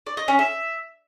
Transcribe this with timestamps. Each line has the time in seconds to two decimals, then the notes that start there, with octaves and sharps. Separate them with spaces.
0.06 D5
0.17 D#5
0.28 C#4
0.39 E5